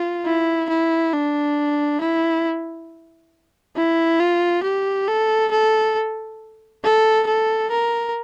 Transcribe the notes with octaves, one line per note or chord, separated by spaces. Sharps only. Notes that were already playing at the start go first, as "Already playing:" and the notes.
Already playing: F4
E4
E4
D4
E4
E4
F4
G4
A4
A4
A4
A4
A#4